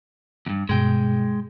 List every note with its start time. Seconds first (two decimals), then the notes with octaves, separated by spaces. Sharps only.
0.46 E2 G2
0.69 G2 B2 G#3 G5